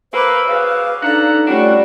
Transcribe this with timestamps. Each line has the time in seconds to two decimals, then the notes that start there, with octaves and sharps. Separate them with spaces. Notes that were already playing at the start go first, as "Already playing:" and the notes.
0.13 A#3 B4 C5 D6 E6
0.48 C#3 F#4 B4 F5
1.03 D4 D#4 A4 E5 F#5 A#5
1.47 G3 A3 C#4 D4 F4 F#4